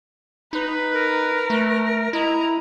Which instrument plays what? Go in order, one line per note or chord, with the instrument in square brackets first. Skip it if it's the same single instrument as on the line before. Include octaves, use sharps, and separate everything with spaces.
[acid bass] D#4 [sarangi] B4
[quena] A#4
[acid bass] A3
[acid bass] E4 [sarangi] D#5 [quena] A#5